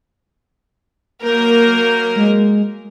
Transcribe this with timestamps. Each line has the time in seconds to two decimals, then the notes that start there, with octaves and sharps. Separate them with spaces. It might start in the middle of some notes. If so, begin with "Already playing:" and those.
1.23 F#3 A#3 A#4 G6
2.16 G#3